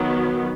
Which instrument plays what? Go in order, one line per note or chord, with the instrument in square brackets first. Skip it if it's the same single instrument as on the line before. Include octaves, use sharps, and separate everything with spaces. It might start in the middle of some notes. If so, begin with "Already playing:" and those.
Already playing: [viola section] D#3 F#3 B3